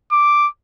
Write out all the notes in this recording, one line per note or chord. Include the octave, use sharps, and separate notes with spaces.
D6